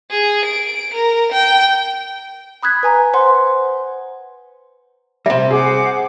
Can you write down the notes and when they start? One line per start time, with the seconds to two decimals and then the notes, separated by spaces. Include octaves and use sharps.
0.10 G#4
0.45 D7
0.93 A#4
1.32 G5
2.63 B5 D#6 F#6 G#6 B6
2.83 B4 G#5 A#5
3.14 C5 F#5 C6
5.26 C3 G3 E5
5.50 G#4 C5 F#5 D6